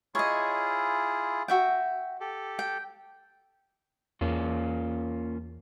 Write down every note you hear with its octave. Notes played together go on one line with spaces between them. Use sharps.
E4 F4 G#4 C#5 D#5
F#4 E5 G5
G4 A4
G5
E2 A#3 C#4 F4